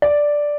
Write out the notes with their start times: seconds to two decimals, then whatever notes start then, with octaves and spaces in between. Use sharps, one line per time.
0.02 D5